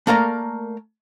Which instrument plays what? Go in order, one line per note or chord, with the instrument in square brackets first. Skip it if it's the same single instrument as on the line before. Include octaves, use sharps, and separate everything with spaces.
[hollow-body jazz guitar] A3 A#3 A#4 D5 A#5